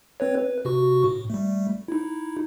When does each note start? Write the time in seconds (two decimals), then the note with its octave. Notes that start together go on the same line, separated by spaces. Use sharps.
0.20 C4 B4 C#5
0.38 B4
0.65 C3 F#4 C#6
1.04 A2
1.30 G3 A3
1.88 D#4 E4